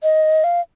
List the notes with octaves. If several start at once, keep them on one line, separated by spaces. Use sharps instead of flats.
D#5
F5